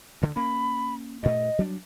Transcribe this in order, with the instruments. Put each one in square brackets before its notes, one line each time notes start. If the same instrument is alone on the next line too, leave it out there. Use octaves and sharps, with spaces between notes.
[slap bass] D2 D3
[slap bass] A#3 C#4 [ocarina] B5
[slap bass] G2 A#2 A3 [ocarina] D#5
[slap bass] F#3 G3 D4